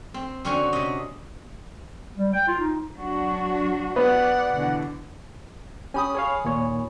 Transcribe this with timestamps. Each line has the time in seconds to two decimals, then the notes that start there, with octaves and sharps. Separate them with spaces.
0.14 C4
0.45 D3 C4 C#4 F#4 G#5
0.73 C3 D#5
2.17 G3
2.33 G5
2.47 F4
2.60 D#4
2.95 F#3 D4 F#4
3.96 B3 D5 F#5
4.53 B2 D3 E3
5.94 C#4 G4 G#5 B5 D#6
6.15 G#4 C#5 F5
6.45 D#2 A#2 C#5